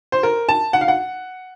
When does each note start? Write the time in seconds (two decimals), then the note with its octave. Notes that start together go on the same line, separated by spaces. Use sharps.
0.12 C5
0.23 A#4
0.49 A5
0.73 F#5
0.81 F5
0.88 F#5